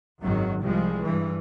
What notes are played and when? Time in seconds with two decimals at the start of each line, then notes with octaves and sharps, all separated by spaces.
0.21 G#1 F#2 D#3 F#3
0.60 C2 F3 G3 G#3
1.01 G2 E3